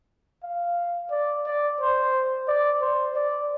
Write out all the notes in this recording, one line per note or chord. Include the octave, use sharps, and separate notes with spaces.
F5
D5
D5
C5
D5
C5
D5